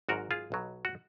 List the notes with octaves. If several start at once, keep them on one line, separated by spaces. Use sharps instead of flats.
G#1 G#2 F#3 F#4 A#4
F4 G#4
B1 B2 F#3
F#4